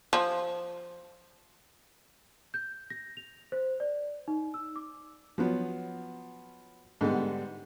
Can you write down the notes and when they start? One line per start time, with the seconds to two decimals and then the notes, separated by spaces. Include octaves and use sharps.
0.13 F3
2.54 G6
2.90 A#6
3.17 F7
3.52 C5
3.80 D5
4.28 D#4
4.54 E6
4.76 D6
5.38 F3 F#3 B3
7.01 G#2 D3 G3 B3